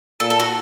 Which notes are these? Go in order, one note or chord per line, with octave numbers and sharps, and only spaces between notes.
A#2 A4
A4
F#4